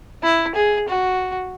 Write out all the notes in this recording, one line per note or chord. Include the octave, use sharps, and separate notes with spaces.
E4
G#4
F#4